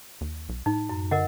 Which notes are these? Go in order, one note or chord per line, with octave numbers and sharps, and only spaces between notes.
D#2
B1
A2 D#4
F#2
D3 A#4 D#5 F#5